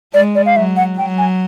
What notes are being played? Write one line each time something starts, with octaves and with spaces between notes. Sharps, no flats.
G#3 D5
D5
F5
F#3 E5
F#5
F#3 G5
G#5